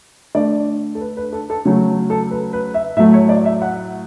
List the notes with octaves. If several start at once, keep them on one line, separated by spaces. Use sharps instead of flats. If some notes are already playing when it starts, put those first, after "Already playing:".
D3 A3 D5
A4
B4
B4
A4
A4
C#3 F#3 A3 C#5
A4
B4
B4
E5
A2 F#3 A3 E5
C#5
D5
E5
F#5